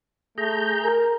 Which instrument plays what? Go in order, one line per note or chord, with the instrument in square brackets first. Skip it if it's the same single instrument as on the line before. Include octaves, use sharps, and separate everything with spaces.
[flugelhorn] A3 [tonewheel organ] G#4 A#5 G6
[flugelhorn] A#4